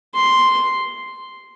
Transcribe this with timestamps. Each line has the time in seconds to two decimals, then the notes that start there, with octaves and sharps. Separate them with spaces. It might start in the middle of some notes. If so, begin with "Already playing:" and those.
0.15 C6